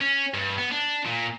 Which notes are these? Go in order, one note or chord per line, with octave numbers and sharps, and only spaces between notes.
C#4
G2
B3
D4
A#2